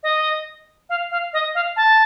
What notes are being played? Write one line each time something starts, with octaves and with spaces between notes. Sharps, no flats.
D#5
F5
F5
D#5
F5
A5